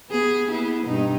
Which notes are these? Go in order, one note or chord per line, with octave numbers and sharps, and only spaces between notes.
B3 G#4
A#3 B3 E4
G2 B2 D#4